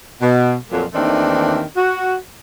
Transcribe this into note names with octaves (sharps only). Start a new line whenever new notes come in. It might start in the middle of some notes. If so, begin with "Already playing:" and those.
B2
F2 A#2 F#3
D#2 D#3 E3 A3 C4 D4
F#4